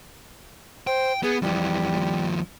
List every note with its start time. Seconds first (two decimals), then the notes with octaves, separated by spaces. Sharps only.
0.87 C5 G5
1.23 B3 G#4
1.42 F2 E3 G3
1.95 D#2 F3